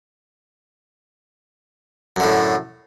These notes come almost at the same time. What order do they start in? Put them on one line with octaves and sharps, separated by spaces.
F#2 D3 A2